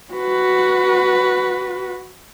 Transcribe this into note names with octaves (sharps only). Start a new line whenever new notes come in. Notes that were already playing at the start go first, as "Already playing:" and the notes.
F#4 B4